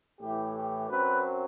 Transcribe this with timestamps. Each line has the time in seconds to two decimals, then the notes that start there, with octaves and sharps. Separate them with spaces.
0.21 A2 E3 A3 G4
0.55 G4
0.89 F#2 F#3 C4 B4